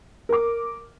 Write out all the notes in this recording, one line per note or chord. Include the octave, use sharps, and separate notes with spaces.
A#4 D6